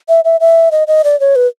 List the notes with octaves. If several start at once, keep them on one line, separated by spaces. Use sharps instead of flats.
E5
E5
E5
D#5
D#5
D5
C#5
B4